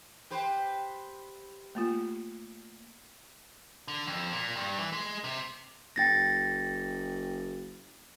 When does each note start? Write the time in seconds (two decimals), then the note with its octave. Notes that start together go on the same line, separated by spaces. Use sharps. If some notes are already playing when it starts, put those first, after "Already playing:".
0.30 G4 B4 C5
1.75 A3 A#3 F4
3.88 D3
4.07 F2
4.32 A#2
4.55 G2
4.78 E3
4.93 G#3
5.24 C3
5.96 F#1 G5 A6 A#6